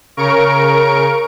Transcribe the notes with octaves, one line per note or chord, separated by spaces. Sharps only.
C#3 A#4 C#6 D7